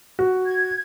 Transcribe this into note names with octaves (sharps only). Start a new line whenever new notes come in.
F#4
G#6